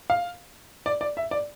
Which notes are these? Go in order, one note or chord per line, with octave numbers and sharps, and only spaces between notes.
F5
D5
D5
E5
D5